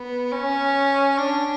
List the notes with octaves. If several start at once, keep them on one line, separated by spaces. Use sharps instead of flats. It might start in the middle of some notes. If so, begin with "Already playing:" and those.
Already playing: B3
C#4
D4